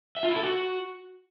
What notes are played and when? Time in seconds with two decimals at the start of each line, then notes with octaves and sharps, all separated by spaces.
0.17 E5
0.23 F4
0.30 E4
0.36 A4
0.43 F#4